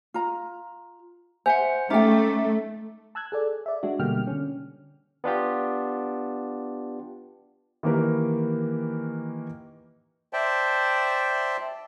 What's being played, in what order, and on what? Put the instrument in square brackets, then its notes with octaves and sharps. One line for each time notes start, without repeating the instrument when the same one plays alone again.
[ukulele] F4 A#5
[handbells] C5 F#5 [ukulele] E5 G#5
[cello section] A3 [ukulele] C#4 A4 G5 [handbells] D#4 E5 D6
[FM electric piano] A5 E6 F#6 G#6
G#4 A4 D5
D5 E5
G#3 D4 F#4
B2 D3 G3 A#3 G5 F6
D3 C#4
[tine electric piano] B3 D4 F4 G4
[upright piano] D#3 E3 A#3 G4 A#4 B4
[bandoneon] C5 D5 E5 G5 A5